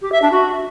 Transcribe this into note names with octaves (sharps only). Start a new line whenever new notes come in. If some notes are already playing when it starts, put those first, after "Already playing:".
G4
E5
D4
F#4